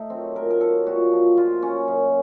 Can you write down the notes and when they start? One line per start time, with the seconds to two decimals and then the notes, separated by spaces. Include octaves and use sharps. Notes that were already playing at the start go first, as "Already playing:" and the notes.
Already playing: A3 D#4
0.10 D#3 F#3 C4
0.36 A#2 A#4
0.50 A#4
0.60 F#3 A4
0.87 A#2 F#4
1.11 F3
1.37 A#2 F4
1.62 F#3 C#4
1.88 F#2